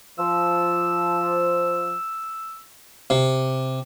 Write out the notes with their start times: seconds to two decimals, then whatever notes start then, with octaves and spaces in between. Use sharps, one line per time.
0.19 F3 E6
3.10 C3